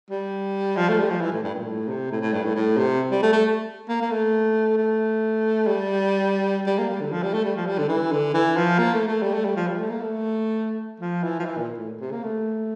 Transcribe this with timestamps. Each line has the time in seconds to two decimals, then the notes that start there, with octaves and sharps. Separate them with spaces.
0.10 G3
0.77 F3
0.88 A3
0.99 G3
1.10 F3
1.21 E3
1.32 A2
1.44 G2
1.54 A#2
1.66 A2
1.88 C3
2.11 A2
2.22 A2
2.33 G2
2.44 A2
2.56 A2
2.77 C3
3.11 G3
3.23 A3
3.33 A3
3.89 A#3
4.02 A#3
4.11 A3
4.77 A3
5.67 G3
6.67 G3
6.78 A#3
6.89 G3
7.01 D3
7.12 F3
7.23 G3
7.34 A3
7.45 G3
7.56 F3
7.67 G3
7.78 D3
7.89 E3
8.12 D3
8.34 E3
8.57 F3
8.79 A#3
8.94 A3
9.08 A3
9.22 G3
9.34 A3
9.45 G3
9.56 F3
9.68 G3
9.78 A3
9.90 A#3
10.01 A3
11.00 F3
11.23 E3
11.40 F3
11.45 E3
11.57 A#2
11.78 A2
12.01 C3
12.12 A#3
12.23 A3